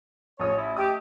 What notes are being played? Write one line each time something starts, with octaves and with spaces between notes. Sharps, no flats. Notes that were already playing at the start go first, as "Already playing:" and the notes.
A1 F3 C#5 D#6
E4
A3 G4 D#5 D#6